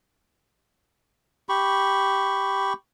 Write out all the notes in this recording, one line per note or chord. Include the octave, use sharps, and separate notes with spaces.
G4 B5 C#6